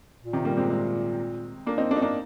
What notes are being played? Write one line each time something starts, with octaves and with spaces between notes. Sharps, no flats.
A#2
C3 D#3
G3 A#3
G#3 C4
G#3 C4
A#3 D4
C4 D#4
A#3 D4
D#4
A#3 D4